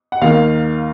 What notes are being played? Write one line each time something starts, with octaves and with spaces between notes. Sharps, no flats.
F#5
D#2 D#3 A#3 F5